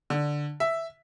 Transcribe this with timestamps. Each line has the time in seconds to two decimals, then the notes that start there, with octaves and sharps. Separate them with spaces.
0.10 D3
0.60 E5